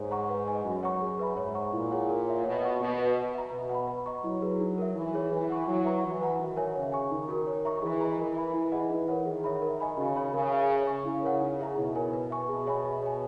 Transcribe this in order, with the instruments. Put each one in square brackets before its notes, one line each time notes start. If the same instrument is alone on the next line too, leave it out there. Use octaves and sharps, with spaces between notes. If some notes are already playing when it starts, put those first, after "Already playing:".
Already playing: [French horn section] G#2 [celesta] C#5
[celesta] F#5 A#5 C#6
B4
D#5 G#5
[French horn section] F#2 [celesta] F#4
[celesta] C#5 F#5 A#5 C#6
G#4
B4 E5 B5
[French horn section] G#2 [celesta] C#5
[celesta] F#5 A#5 C#6
[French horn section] A#2 [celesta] E4
[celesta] G#4 C#5 F#5
A#4
C#5 E5
[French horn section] B2 [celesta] C#5
[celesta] F#5 C#6
[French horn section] B2 [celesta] F#4
[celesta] B4 D#5
B4
E5 A#5
[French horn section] B2 [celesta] B4
[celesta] F#5
B5
B4
D#5 A#5 C#6
[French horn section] F#3 [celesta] E4
[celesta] G#4 B4
D#4
A#4 E5
[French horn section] E3 [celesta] E4
[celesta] G#4 C#5
[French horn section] E3 [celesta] B4
[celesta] F#5 C#6
[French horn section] F#3 [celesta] E4
[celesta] B4 E5 A#5 C#6
[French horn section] E3 [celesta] F#4
[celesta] B4 F#5 A#5
[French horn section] D#3 [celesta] F#4
[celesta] A#4 C#5 E5 G#5
[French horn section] C#3 [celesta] C#5
[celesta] G#5 C#6
[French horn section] D#3 [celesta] D#4
[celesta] F#4 A#4
C#5
E5 A#5 C#6
[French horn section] E3 [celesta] G#4
[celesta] D#5 A#5
[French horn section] E3 [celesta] A#4
[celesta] E5 B5
[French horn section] E3 [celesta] E4
[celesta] G#4 D#5 F#5
[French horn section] E3 [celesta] D#4
[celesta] A#4 C#5 F#5
[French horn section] D#3 [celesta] G#4
[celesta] C#5 E5 B5
A#4
D#5 G#5 B5
[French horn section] C#3 [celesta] F#4
[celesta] C#5 G#5 B5
[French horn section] C#3 [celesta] A#4
[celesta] E5 G#5
C#5
G#5 C#6
[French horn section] C#3 [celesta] E4
[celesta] A#4 C#5 F#5
D#4
G#4 C#5 E5 A#5
[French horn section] B2 [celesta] E4
[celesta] A#4 C#5 G#5
B4
E5 G#5 C#6
[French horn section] B2 [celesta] G#4
[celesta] C#5 E5 G#5 B5
G#4
C#5 G#5